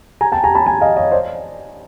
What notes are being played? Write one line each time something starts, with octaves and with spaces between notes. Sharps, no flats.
G#5 A#5
G5 A5
G#5 A#5
A5 B5
G#5 A#5
D#5 F5
C#5 D#5
C5 D5